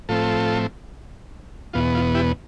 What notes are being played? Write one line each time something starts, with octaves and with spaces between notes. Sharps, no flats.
A2 F3 A3 C4 F4 A4
E2 B2 B3 F4
F4
E4 G4